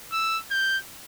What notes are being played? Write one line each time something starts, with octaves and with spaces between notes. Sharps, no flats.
E6
G6